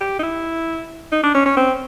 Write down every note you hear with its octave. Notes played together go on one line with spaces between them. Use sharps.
G4
D#4
E4
D#4
D4
C#4
C#4
C4